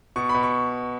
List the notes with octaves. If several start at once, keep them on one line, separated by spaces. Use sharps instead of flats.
B2 C#6
B5
B2
C#6